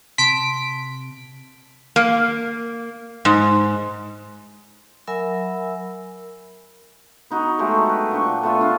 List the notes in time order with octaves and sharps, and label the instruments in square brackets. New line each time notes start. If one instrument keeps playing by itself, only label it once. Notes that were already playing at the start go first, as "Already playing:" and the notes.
[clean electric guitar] C3 A5 C6 [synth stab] B6 D7
[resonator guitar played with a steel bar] A#3
G#2
[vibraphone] F#3 A#4 E5 G#5 B5 E6
[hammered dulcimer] B3 D#4 F#4
F#3 G#3 A3 G4
B4
A#2 D4 G5 C#6
A3 B3 F4
D4 F4